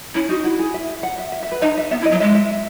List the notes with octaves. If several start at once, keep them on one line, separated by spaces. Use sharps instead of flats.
C#4 E4
D#4 F#4
E4 F#4
G#4
E5
F#5
E5
E5
E5
B4
D#4 D#5
E5
B3 E5
E4
D#5
F#3
G#3 E5
E5